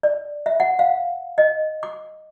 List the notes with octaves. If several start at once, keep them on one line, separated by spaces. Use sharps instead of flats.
D5
E5
F#5
F5
D#5
D6